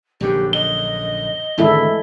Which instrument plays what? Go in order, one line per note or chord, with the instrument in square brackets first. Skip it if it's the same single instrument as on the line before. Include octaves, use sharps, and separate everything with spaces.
[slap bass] A#1 F#2 D3 [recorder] G4
[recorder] D#5 [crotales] G7
[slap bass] G#1 D2 [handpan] G#3 E4 A4